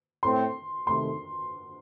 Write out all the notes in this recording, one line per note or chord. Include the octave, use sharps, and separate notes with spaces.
A2 A3 C4 C6
C3 D#3 A3 C6